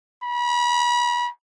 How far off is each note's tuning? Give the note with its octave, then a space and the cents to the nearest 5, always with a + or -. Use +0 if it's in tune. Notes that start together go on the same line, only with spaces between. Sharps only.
B5 -35